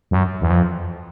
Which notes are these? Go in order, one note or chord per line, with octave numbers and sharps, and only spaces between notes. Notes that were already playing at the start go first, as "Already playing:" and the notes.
F#2
E2
F2